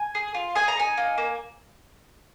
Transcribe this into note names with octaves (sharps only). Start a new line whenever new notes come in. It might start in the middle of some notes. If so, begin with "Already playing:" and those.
Already playing: G#5
G#4
F4
G#4 G#5
A#5
D#4 G#5
A#3
A#3